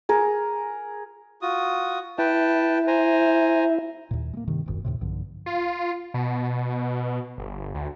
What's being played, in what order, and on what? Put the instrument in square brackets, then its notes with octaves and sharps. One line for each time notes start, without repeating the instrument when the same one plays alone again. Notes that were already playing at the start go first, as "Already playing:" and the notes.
[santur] G#4 A#4
[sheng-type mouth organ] F4 F#4 D#6
[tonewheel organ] E4 [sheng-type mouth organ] B4 G5 A5
[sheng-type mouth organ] C5 G#5 A#5
[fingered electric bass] D#2 A#2
G#3 A#3
G2 C3 D#3
D#1 G#1 F#2
D#2 A2 C3
B1 G2 D3 F3
[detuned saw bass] F4
B2
G1
D2